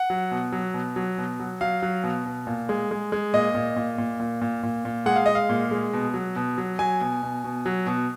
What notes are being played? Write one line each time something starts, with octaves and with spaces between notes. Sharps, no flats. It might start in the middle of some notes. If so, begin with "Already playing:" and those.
Already playing: F#5
F#3
B2
F#3
B2
F#3
B2
F#3
F#3 F5
F#3
B2
B2
A#2
G#3
G#3
G#3
A#2 D#5
A#2
A#2
A#2
A#2
A#2
A#2
A#2
G#3 F#5
F5
G#3 D#5
F5
A#2
G#3
B2
F#3
B2
F#3
F#3 G#5
B2
B2
B2
F#3
B2